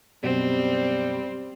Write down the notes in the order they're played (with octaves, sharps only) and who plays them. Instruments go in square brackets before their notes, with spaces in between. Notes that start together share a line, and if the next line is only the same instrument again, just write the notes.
[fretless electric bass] F#2 B2 [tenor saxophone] G3 [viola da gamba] C4